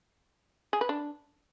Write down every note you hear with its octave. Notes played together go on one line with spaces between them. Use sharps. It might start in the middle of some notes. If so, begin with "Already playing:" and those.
G#4
B4
D4